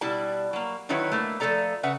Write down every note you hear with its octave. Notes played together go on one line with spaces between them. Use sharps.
B2 G3 E4 D5 A5
F#3 A#3
D3 D#3 F#3 E4 B4 C#5
A3 A#3
F3 A3 C#4 A4 D5 A#5
C#3 B4 E5 F#5